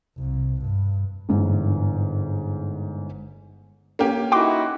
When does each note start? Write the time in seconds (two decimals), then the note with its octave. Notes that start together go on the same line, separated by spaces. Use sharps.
0.17 C2
0.62 G2
1.29 G1 G#2 E3
3.99 A#3 C#4 G4
4.32 D#4 E4 F#4 G5 C6 D6